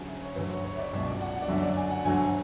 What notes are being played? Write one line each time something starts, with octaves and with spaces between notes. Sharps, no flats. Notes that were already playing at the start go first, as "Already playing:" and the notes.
Already playing: D2 C#3 F#3 G#5
E5
C#5
D2 D3 F#3 B4
C#5
C#5
E5
D5
C#2 B2 F#3 E5
D5
F#5
F#5
D5
F#2 D3 F#3 E5
D5
G#5
F#5
D2 D3 F#3 G#5